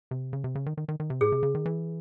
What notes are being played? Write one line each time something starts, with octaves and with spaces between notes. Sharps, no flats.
C3
C#3
C3
C#3
D#3
D#3
D#3
D#3
C3
A2 G#4
C3
C#3
D#3
E3